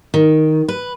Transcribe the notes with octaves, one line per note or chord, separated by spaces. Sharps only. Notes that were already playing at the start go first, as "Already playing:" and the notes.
D#3
B4